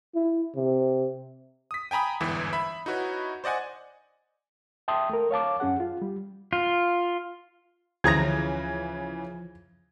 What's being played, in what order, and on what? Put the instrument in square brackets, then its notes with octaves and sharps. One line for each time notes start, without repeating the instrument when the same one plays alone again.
[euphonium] E4
C3
[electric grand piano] D#6 B6
G5 G#5 A#5 B5 D#6
G1 E2 G#2 E3 E4
E5 B5
D#4 E4 F#4 B4 C#5
C5 D5 D#5 F#5 G#5
[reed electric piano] E5 G5 A5 C6 D#6
A3 A#4
C#5 F5 A5 D6
F#2 C#4 G#4 F#5
F4
G3
[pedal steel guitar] F4
[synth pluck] D2 G#4 A#5 [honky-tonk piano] C#3 E3 [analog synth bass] F3 [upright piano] G#6 A#6